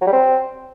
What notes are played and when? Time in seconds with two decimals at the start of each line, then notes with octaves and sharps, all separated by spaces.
0.01 F#3
0.07 G3
0.13 C4